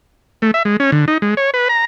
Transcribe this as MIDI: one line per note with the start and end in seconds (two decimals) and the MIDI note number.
0.42 0.51 57
0.54 0.63 76
0.65 0.77 56
0.80 0.91 61
0.92 1.05 50
1.08 1.18 63
1.22 1.35 56
1.37 1.51 73
1.54 1.68 71
1.69 1.85 82